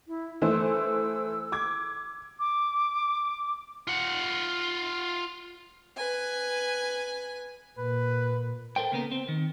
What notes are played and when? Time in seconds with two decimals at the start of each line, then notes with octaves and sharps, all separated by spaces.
0.07 E4
0.42 E3 A3 C5 E6
0.70 E6
1.52 D6 G#6
2.39 D6
3.87 F4 F#5
5.97 B4 G#5
7.79 A#2 B4
8.76 A4 A#4 C5 G5
8.92 C#3 A#3 B3 A#4
9.12 C4
9.29 D#3